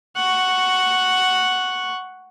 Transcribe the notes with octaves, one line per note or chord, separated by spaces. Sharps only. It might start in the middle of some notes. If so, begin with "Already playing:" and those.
F#5 C#6